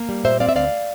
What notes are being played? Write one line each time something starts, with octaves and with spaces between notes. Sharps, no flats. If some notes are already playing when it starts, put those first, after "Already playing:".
Already playing: A#3
G3
A#2 C5 E5
C4 D5 F5
E5
D2 D5 F5